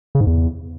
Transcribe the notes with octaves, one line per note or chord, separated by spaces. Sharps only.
C#3
G#2
E2